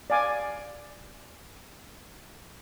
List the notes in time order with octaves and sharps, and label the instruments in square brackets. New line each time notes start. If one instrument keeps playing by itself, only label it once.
[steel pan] D5 F5 G#5 D6